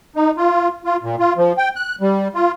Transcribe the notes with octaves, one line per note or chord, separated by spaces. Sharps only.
D#4
F4
F4
A#2
F4
F3
G5
F#6
G3
F4